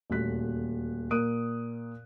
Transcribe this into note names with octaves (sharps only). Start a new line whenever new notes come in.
D#1 D2 A#2 F#4 F#6 B6
A#2 A#4 D#6 F#6 D7 D#7